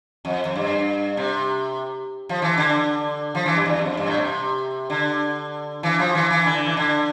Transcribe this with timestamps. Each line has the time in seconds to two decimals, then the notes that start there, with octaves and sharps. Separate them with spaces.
0.25 F2
0.45 F2
0.55 G2
1.17 C3
2.29 F3
2.42 E3
2.58 D3
3.35 F3
3.46 E3
3.55 G2
3.66 E2
3.81 F2
3.97 G2
4.07 A2
4.17 C3
4.90 D3
5.83 E3
5.99 F3
6.15 E3
6.30 E3
6.46 D3
6.66 E3
6.77 D3